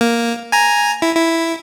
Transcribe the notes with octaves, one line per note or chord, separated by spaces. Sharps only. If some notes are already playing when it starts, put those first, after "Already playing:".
A#3
G#5 A#5
E4
E4